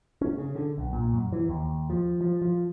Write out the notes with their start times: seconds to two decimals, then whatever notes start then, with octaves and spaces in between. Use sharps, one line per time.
0.21 C#4
0.38 C#3
0.55 D3
0.78 B1
0.93 A#2
1.13 F#2
1.32 E3
1.49 D#2
1.90 F3
2.21 F3
2.42 F3